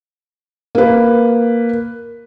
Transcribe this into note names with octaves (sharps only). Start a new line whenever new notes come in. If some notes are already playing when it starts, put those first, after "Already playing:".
A#3 B4